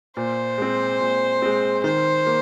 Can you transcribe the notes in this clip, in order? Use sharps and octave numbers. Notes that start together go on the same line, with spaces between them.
A#2 C5
G#3 C4
A#2
G#3 C4
D#3 C5
A#3